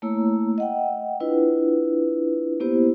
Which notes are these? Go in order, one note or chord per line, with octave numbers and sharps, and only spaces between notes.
A3 A#3 E4 C#5 A#5 E6
D#5 F#5 G5
D4 E4 F4 B4
A#3 B3 E4 G4 C5